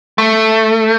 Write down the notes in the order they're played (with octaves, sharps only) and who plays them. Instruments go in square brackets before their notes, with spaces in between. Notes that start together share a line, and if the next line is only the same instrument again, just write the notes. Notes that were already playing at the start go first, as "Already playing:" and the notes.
[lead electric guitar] A3